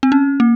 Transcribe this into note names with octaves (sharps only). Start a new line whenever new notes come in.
C4
C#4
A#3